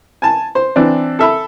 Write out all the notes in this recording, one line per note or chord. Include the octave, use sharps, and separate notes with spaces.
G#5 A5
C5
E3 C4 D4
A4 E5 B5